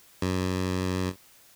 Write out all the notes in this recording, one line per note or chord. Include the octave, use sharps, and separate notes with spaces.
F#2